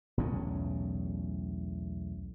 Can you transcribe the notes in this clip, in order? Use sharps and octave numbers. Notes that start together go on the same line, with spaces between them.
B1 E2 A2 C#4